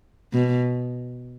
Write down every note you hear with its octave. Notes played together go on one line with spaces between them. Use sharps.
B2